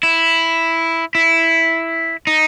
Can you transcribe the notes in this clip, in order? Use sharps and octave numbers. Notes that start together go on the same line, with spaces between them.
E4
E4
D#4